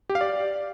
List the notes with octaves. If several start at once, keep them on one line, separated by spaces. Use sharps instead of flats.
G4
F5
D5